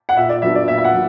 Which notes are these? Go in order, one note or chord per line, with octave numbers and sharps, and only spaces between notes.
F#5
A#2 E5
D5
F#3 B3 D4 E5
D5
A#2 E5
E5
F#5
F#3